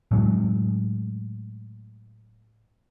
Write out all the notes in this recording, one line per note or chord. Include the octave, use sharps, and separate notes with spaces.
A2 F#3 G#3